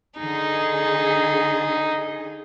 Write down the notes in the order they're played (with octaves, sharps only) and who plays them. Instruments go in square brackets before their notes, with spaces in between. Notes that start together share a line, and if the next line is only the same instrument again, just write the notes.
[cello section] D3 G#4 [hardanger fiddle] D#4